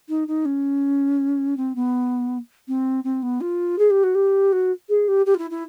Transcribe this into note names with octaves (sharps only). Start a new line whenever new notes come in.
D#4
D#4
C#4
C4
B3
C4
C4
B3
F4
G#4
G4
F#4
G4
F#4
G#4
G4
G4
F4
E4
E4